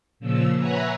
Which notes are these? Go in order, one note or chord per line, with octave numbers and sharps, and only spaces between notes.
A#2 C#3 F3 E6
B4 C#5 E5 F#5 G#5 A#5